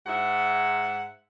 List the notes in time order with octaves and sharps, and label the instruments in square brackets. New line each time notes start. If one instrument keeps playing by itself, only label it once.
[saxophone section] G#2 E5 F#5